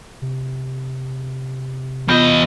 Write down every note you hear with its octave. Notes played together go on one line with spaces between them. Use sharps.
C3
E2 B3 F4 D#5 G6